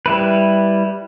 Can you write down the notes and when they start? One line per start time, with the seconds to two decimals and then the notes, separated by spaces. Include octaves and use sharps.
0.06 G3 E4 B4